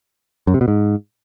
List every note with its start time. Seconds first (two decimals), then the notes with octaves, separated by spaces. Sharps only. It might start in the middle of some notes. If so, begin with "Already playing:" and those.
0.47 F#2
0.54 C3
0.61 B2
0.68 G#2